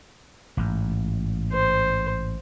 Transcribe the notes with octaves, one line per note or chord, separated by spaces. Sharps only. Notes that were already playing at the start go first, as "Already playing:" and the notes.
A1 G#2
C5